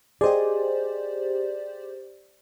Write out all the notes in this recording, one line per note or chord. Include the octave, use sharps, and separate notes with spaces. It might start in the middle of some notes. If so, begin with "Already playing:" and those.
G4 G#4 C5 D5 D#5